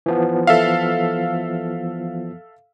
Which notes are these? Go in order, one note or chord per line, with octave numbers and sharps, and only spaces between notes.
E3 F3 B3
A4 E5 F5